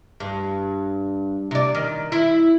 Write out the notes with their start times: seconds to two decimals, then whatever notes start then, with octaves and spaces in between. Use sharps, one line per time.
0.20 G2
1.51 C3 D5
1.75 D#3
2.12 E4